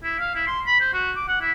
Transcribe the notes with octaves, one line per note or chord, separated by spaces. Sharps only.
E4
F5
E4
C6
B5
C5
F#4
D6
F#5
E4